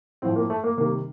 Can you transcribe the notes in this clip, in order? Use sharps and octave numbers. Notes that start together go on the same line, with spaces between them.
A2 F3 C4
A#3
A3
A#3
C3 D#3 G3 A#3